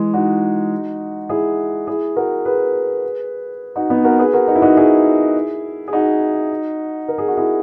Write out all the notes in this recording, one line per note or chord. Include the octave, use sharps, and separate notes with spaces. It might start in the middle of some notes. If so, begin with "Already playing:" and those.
Already playing: E3 G#3
D#4 F#4
E4 G#4
E4 G#4
F#4 A#4
G#4 B4
D#4 F#4
B3 D#4
F#4 A#4
G#4 B4
F#4 A#4
D#4 F#4
E4
D#4 F#4
E4 G#4
G#4
D#4 F#4
A#4
G#4
F#4
E4 G#4